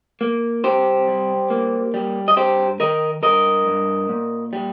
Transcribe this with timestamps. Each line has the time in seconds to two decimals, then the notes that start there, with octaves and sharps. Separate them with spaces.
0.21 A#3
0.64 C2 G4 C5
1.08 G3
1.50 A#3
1.94 G3
2.28 D#5
2.36 G2 G4 C5
2.80 D#3 A#4 D#5
3.23 G2 A#4 D#5
3.67 G2
4.09 A#2
4.53 G3